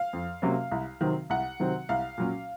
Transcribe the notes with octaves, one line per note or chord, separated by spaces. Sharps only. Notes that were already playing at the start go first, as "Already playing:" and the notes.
Already playing: F5
F2
C3 F#3 A#3 C#4
C2
C3 D#3 F#3 C4
C2 F#5
C3 D#3 F#3 C4
C2 F5
A#2 F#3 C#4